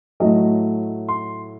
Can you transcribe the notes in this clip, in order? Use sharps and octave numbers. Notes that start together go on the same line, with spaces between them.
A2 F#3 A3 D#5
C6